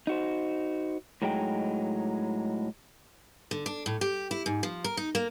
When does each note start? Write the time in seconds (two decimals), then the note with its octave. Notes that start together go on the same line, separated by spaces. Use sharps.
0.07 D#4 F#4 C5
1.22 A2 F#3 G#3 D#4 G5
3.51 D3
3.66 D4
3.86 A2
4.01 G4
4.31 E4
4.46 G#2
4.63 F3
4.84 A#4
4.97 D#4
5.15 A#3